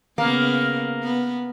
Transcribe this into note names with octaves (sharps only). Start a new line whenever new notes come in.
C#3 A#3 B3
B3